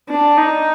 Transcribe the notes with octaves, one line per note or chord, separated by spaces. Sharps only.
D4
D#4